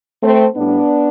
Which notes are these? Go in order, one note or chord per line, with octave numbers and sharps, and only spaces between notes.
A3 C4
A2 G3 B3 D4